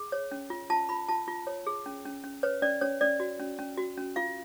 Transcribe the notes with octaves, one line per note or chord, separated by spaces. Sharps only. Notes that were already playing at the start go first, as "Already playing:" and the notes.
Already playing: G#4
C#5
C#4
F4
F4 A5
F4 B5
F4 A5
F4
C#5
G#4
C#4
C#4
C#4
B4 C#5
C#4 D5
C#4 C#5
C#4 D5
F#4
C#4
C#4
F#4
C#4
F4 F5